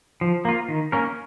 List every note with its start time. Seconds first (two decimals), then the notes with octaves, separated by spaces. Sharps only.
0.21 F3
0.45 A#3 F4
0.68 D#3
0.92 A#3 C#4 A#4